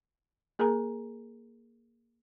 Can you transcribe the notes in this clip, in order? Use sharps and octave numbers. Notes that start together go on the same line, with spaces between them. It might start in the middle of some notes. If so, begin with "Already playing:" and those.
A#3 G#4 A#4 G#5 A#5